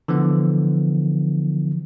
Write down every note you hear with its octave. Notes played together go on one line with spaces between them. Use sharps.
D3 E3 F3 B3